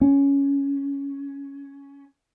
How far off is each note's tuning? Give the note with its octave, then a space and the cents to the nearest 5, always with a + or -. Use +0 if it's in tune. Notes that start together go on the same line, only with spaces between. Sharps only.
C#4 +10